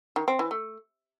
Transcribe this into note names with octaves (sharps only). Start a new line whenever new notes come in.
D#3
C4
E3
A3